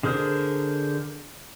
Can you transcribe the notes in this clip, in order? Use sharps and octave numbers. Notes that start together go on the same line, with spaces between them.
D3 G#4 A#4 C5